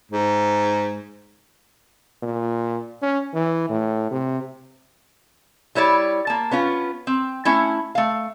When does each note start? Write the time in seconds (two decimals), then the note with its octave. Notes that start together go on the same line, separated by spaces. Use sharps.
0.11 G#2
2.22 A#2
3.02 C#4
3.34 E3
3.69 A2
4.11 C3
5.75 G3 E4 C#5 D5
6.27 A#3 A5
6.51 B3 C#4 F4
7.07 C4
7.45 A3 C#4 E4
7.95 A3 F5